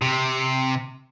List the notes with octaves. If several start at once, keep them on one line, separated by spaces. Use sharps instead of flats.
C3